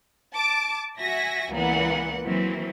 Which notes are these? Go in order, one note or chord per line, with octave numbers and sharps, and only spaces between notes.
A5 D6
F#4 E5 G#5 A#6 B6
C#2 A#2 E3 B3 F#5
E3 F#3 A#3 C4